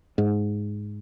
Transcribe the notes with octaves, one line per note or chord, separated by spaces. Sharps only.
G#2